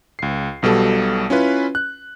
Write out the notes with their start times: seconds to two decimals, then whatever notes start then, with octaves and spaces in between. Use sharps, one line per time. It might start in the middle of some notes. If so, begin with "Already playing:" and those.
0.19 C#2 C7
0.63 B1 B2 G3 A4
1.30 C#4 E4 F4 B4
1.75 F#6